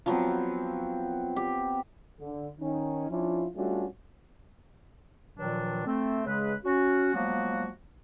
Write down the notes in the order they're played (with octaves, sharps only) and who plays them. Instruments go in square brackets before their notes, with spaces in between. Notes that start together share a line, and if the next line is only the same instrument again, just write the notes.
[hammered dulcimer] F3 F#3 B3 C4
G4
[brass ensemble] D3
D#3 C#4 D#4
F3 C#4 D4 E4 F4
G3 A3 C#4 D4 F4 F#4
[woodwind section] G2 A#2 D#3 F3 F#3 D4
A3 C4
C#3 G#3 B4
C#4 F#4
F3 F#3 G#3 A#3 B3 F#4